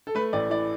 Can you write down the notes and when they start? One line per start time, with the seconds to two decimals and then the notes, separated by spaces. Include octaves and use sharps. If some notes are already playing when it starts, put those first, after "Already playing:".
0.07 A4
0.15 A3 B4
0.33 A1 D5
0.50 E3 D5